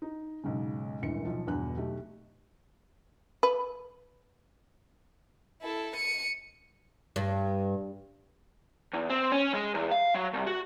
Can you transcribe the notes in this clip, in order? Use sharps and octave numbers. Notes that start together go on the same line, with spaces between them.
D#4
B1 G#2 C#3
D#1 G#1 D2 E3 C#7
B1 F3
G1 E2 B2 D3 F#6
B1 A3 G4
B4
E4 A4
C#7 D#7
G2
E2
C4
C#4
G#3
E2
F5
F#3
C2
F#4